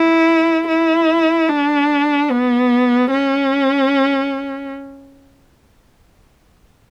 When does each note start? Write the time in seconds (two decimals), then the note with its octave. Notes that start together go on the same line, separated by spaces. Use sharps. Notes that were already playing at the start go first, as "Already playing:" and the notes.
Already playing: E4
0.68 E4
1.48 D4
2.30 B3
3.11 C#4